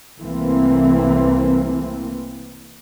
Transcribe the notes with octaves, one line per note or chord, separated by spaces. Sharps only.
C2 E3 A3 A#3 C4